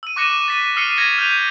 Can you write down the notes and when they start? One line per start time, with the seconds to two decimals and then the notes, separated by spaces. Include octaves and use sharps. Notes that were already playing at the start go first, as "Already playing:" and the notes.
0.03 E6 D#7
0.16 C#6 D6 F#6 A#6 C#7 E7
0.48 A6 B6
0.76 D#6 F6 C7 C#7 D#7
0.96 F6 G#6 A#6 C#7 D#7
1.18 F6 G6 D#7 F7